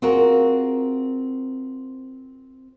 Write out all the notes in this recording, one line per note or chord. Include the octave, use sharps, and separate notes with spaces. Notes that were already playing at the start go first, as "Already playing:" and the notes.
C4 F4 F#4 G#4 A#4